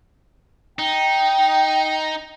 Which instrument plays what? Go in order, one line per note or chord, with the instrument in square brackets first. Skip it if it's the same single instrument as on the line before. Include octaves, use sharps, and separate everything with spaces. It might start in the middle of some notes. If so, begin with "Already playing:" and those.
[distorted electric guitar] D#4 [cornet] G5